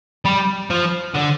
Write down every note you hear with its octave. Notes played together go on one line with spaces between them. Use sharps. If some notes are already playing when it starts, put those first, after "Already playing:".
G3
F3
D3